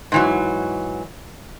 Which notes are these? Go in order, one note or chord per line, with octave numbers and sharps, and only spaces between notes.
G#2 E3 F#3